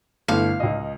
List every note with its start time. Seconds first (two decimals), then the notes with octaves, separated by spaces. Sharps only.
0.28 G1 A3 E4 F5
0.60 C#2 D#5